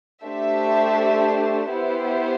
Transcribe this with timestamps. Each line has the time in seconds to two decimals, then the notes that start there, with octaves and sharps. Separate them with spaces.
0.23 A3 D4 G4 C5 E5
1.69 B3 E4 G4 C5